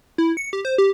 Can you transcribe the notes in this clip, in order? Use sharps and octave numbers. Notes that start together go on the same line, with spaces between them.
E4
C#7
G4
C5
G4